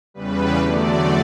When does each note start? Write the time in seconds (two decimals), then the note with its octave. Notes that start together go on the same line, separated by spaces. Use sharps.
0.14 E2 C#3 G3 B4
0.57 E2 D3 F#3 A3 D5